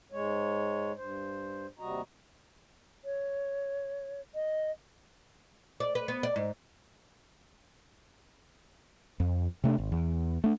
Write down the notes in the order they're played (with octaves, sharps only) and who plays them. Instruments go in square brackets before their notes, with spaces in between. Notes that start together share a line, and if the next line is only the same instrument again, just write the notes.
[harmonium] G#2 G#3 C#5
G2 C5
D#2 C3 G3 F#4 D#5 A#5
[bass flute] C#5
D#5
[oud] D5
B4
B3
D5
G#2
[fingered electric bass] F2
C3 A3 C#4 D4
G#1
E2
A3 D4